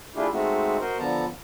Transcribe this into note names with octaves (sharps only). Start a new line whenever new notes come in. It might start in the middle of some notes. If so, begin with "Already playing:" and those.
A3 D4 E4 F4 G4 G#4
G#3 A3 C4 D#4 F#4
F#4 A#4 C5 D#5
D3 F3 B3 A5 A#5